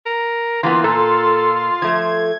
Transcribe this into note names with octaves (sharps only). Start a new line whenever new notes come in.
A#4
E3 A#3 B3 F4 C6
A#2 A4 C6
F3 A3 G#6